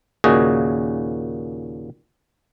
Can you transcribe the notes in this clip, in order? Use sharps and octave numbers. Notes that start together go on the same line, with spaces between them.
D#2 A#2 C#3 F#4 G#4 D#5